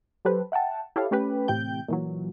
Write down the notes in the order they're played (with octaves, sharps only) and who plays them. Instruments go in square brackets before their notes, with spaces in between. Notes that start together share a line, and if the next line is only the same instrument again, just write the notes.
[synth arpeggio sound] F#3 G4 A4 B4 C5
E5 F#5 G5 A5
E4 G4 A4 C#5 E5 F5
A3 C#4 G4 B4
A2 C3 E3 G5 G6
A#2 E3 F#3